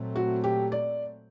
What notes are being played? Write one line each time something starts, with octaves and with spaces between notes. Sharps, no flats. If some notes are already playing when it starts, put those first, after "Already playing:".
Already playing: A#2 F#3 A3 C4
F#4
G4
D5